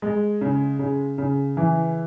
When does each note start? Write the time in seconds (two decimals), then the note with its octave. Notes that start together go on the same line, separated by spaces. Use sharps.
0.02 G#3
0.41 C#3
0.79 C#3
1.18 C#3
1.57 E3